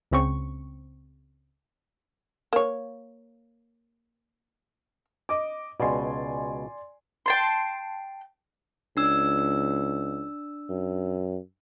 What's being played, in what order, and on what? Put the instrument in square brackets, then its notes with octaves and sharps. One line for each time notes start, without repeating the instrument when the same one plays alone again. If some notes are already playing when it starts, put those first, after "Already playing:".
[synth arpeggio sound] C#2 C#3 C4 C#6
[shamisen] A#3 C#5
[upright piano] D#5 D6
[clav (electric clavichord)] C#2 B2 [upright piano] D5 G#5 C6
[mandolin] G5 A5 C6
[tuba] C#2 [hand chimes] D4 E6
[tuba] F#2